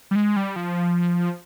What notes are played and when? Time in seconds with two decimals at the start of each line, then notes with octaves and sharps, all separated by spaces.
0.11 G3
0.16 G#3
0.36 G3
0.56 F3